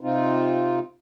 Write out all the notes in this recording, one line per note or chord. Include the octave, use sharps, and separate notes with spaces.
C3 C4 D#4 F4